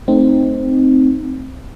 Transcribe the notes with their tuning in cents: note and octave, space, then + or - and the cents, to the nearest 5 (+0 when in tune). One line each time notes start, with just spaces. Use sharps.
A3 +0 C4 +0 D#4 +0